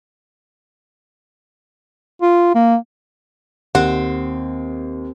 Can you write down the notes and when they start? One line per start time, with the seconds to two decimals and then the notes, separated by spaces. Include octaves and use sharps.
2.22 F4
2.55 A#3
3.75 D#2 C4 F#5